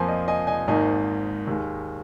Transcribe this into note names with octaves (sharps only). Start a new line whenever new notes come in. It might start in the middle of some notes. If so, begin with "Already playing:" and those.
Already playing: F2 F3 A#3 G#5 C6
D#5
D#5 G#5
D#5 G#5
G#1 G#2 D#3 A#3 D#5 G#5
D#2 D#3 G#3